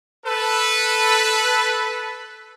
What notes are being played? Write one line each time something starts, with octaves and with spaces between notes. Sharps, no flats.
A4 B4